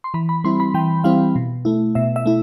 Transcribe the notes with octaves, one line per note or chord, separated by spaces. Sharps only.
C6
E3 B5
B5
G3 C4 E4 C6
B5
E3 G5
G3 C4 E4 F5
B2
A3 E4
B2 E5
E5
A3 E4